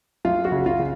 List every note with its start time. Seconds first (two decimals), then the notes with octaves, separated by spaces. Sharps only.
0.25 F#2 F4
0.45 F#4
0.52 C#3
0.66 F4
0.79 C#3